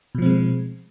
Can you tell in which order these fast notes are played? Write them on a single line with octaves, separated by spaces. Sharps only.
B2 F3 C4 G#3